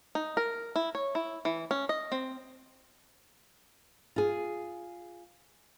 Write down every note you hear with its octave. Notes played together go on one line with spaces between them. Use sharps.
D#4
A#4
E4
C#5
E4
E3
C#4
D#5
C4
F4 G#4